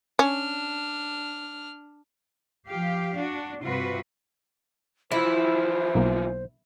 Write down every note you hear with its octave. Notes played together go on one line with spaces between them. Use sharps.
C#4 D4 F6
F3 G4 F5
D4 F#4
G2 C3 F4 F#4 B4
E3 F3 E4 C5
B1 A#3